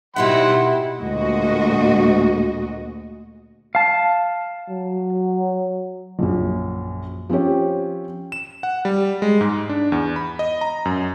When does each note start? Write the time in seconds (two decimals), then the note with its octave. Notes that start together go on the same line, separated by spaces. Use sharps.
0.16 B2 D#3 F#3 E4 G4 E5 F#5 C6
1.01 D2 A#2 G#3 F#4 D#5
3.75 F5 A5
4.70 F#3
6.19 A#1 F#2
7.29 F3 C4 C#4 G4 C#5
8.32 E7
8.63 F#5
8.85 G3
9.22 G#3
9.41 G#2
9.69 D4
9.92 E2
10.16 B5
10.39 D#5
10.61 A#5
10.85 F#2